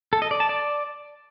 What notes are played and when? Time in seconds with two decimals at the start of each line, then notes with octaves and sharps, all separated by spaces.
0.13 A4
0.22 D#5
0.31 D5
0.40 A5
0.49 D5